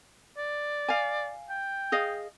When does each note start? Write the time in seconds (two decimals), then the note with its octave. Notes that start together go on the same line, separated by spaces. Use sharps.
0.38 D5
0.88 F5 G#5
1.50 G5
1.92 G#4 D#5 F5